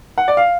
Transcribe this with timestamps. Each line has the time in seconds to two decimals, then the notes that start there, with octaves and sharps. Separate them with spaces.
0.18 F#5
0.28 D5
0.37 F5